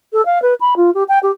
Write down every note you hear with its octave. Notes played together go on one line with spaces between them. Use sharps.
A4
F5
B4
B5
F4
G4
G5
G4